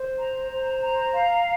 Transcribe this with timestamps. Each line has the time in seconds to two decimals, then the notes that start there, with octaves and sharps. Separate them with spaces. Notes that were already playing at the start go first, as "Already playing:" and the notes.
Already playing: C5
0.19 A#5
0.51 C5
0.82 A#5
1.13 F5